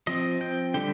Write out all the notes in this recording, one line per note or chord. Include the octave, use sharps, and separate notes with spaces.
F3 C4 D#5
G5
D3 G3 G5